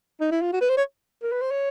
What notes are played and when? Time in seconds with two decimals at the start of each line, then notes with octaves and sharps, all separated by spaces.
0.20 D#4
0.31 E4
0.42 F4
0.53 F#4
0.61 B4
0.69 C5
0.77 C#5
1.22 A#4
1.32 B4
1.41 C5
1.51 C#5